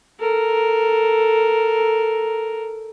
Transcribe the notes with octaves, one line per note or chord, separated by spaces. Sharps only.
A4 A#4